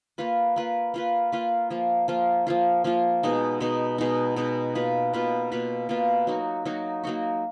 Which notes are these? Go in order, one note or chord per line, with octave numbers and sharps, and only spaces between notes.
A#3 F4 B4
A#3 F4 B4
A#3 F4 B4
A#3 F4 B4
F3 A#3 F4
F3 A#3 F4
F3 A#3 F4
F3 A#3 F4
B2 G#3 D#4
B2 G#3 D#4
B2 G#3 D#4
B2 G#3 D#4
B2 A#3 F4 B4
B2 A#3 F4 B4
B2 A#3 F4 B4
B2 A#3 F4 B4
F#3 A#3 D#4 F#4
F#3 A#3 D#4 F#4
F#3 A#3 D#4 F#4